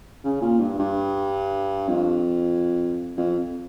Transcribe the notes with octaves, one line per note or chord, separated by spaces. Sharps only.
C#3
A#2
G2
G2
F2
F2